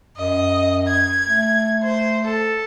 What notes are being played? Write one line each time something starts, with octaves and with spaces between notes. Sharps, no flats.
F#2 D#5
G#6
A3
C5
A4